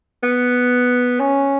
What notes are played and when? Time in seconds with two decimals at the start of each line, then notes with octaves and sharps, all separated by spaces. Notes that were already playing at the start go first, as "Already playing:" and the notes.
0.23 B3
1.20 C#4